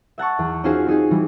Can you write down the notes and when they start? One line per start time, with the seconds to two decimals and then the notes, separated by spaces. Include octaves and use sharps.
0.18 E5 F#5 A5 C#6
0.39 E2
0.64 C#4 D#4 F4 F#4 G#4 C5
0.86 C4 D#4 G#4
1.11 E3 G3